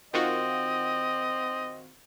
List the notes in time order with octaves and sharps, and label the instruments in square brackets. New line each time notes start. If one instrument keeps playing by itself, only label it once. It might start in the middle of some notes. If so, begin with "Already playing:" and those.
[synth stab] D#3 F4 F#4 [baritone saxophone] C4 [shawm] D#5